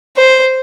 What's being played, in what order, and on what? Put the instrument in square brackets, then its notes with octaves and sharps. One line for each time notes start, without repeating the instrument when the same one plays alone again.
[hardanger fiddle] C5